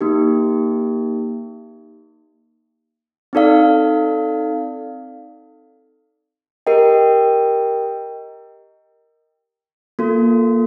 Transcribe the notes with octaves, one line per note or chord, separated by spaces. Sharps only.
A#3 D#4 G4
C4 D#4 A4 D5 F5
G4 A#4 D#5 G5
A#3 F4 A4